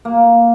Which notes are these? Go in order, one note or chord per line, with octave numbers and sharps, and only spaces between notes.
A#3